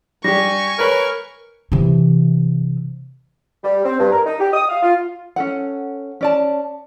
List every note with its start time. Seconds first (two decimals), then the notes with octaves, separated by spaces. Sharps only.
0.24 G3 D4 G4 G#5 C#6 A#6
0.79 A#4 B4 C#5
1.72 C3 E3
3.64 G3
3.84 C4
3.99 G2
4.12 A#4
4.26 D#4
4.40 G4
4.54 D#6
4.69 F5
4.83 F4
5.36 C#4 A4 F#5
6.21 C#4 D5 A5